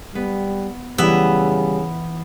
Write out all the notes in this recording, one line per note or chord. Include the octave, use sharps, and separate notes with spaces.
G3 B3
C#3 E3 G3 B3 E4 G4 E5